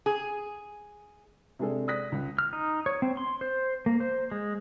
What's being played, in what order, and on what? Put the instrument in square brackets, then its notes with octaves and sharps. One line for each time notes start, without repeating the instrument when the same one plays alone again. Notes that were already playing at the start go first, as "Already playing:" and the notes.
[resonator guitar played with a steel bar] G#4
[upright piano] C3 G#3 D4 G#4 A4
D5 D#6 F#6 A#6 B6
C#2
[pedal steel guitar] F6
D#4
C#5
C4
C6
C5
A#3
C5
G#3